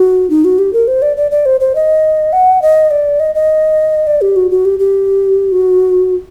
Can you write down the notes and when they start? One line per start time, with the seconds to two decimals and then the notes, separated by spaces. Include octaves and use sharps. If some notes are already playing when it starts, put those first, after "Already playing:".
Already playing: F#4
0.30 D#4
0.44 F#4
0.59 G4
0.73 A#4
0.88 C5
1.02 D5
1.17 D5
1.31 D5
1.46 C5
1.60 C5
1.75 D#5
2.33 F#5
2.62 D#5
2.91 D5
3.20 D#5
3.35 D#5
4.07 D5
4.21 G4
4.36 F#4
4.51 F#4
4.65 G4
4.79 G4
5.52 F#4